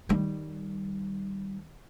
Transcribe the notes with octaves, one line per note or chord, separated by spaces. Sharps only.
D#3 G3